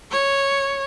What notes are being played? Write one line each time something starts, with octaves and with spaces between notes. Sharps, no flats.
C#5